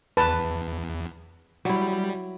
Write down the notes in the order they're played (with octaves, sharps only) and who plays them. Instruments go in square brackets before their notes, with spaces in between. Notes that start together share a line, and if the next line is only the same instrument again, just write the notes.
[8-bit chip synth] E2 [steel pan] B4 A5
[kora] F#3 E4 [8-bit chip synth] G3